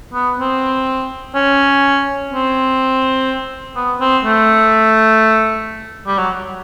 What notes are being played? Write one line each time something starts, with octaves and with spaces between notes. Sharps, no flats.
B3
C4
C#4
C4
B3
C4
A3
G3
F#3